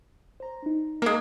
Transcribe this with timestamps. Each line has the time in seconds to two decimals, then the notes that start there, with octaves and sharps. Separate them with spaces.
0.40 C5 A#5
0.63 D4 D#4
1.02 G#3 A#3 A#4